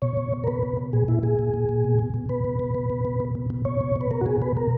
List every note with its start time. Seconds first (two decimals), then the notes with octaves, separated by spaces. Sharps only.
0.02 B2 C#5
0.17 B2
0.33 B2
0.44 A#4
0.47 B2 B4
0.63 B2
0.77 B2
0.93 A#2 G#4
1.08 A#2 E4
1.23 A#2 G#4
1.39 A#2
1.54 A#2
1.69 A#2
1.84 B2
1.99 B2
2.14 B2
2.29 B2 B4
2.44 B2
2.59 B2
2.75 B2
2.90 B2
3.05 B2
3.20 B2
3.35 B2
3.50 B2
3.65 B2 C#5
3.81 B2
3.96 B2
4.01 B4
4.11 B2 A#4
4.21 F#4
4.26 B2 G#4
4.42 B2 B4
4.57 B2 A#4